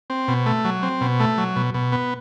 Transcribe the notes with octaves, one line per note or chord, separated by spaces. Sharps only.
C4
B2
A3
F#3
C4
B2
A3
F#3
B2
B2
B3